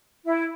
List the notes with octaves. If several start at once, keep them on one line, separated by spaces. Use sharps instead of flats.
E4